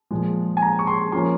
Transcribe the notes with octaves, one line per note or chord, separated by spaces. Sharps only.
A#2 F3 G#3
G#5
A#5
C#6
C6
F3 A#3 C#4 F4 C6